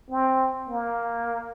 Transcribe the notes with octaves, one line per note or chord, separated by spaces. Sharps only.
C4
A#3